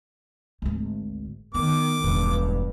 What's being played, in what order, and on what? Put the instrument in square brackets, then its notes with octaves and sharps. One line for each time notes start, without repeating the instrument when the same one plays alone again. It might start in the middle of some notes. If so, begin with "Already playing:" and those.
[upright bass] G#1 D2
[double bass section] D#3 [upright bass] B3 [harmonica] D6
[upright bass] E1 [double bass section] A1 G2